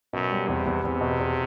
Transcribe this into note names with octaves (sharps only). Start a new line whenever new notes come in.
F#2 B2
G3
E2 C3
E2
E2 C3
B2
E2